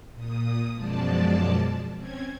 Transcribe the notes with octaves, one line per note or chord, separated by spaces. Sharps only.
A#2 D#6
F#2 B2 F3 G#3 D5 A5
C4 C#4 G#6